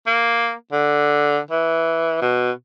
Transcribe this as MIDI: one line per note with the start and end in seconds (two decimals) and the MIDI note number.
0.07 0.53 58
0.72 1.39 50
1.51 2.19 52
2.22 2.51 47